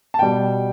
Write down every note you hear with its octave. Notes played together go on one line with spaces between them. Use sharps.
A5
B2 G3 G5